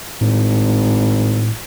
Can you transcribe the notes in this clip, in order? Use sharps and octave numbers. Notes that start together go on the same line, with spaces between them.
G#1 A2